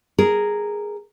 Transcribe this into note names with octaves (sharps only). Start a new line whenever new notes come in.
G#4 A#4